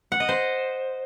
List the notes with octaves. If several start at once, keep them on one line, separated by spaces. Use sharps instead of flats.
F#5
D#5
C5